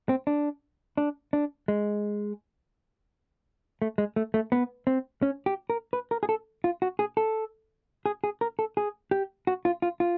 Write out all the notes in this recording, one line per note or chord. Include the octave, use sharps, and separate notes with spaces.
C4
D4
D4
D4
G#3
A3
G#3
A3
A3
B3
C4
C#4
G4
A#4
B4
A#4
G#4
A4
F4
F#4
G#4
A4
G#4
G#4
A#4
A4
G#4
G4
F#4
F4
F4
F4